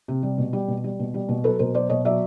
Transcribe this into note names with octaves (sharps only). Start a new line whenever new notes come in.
C3
G3
B2
G3
B2
G3
B2
G3
B2
F#3 A4 B4
B2 A#4 C5
F#3 C5 D5
B2 C#5 D#5
F#3 D5 E5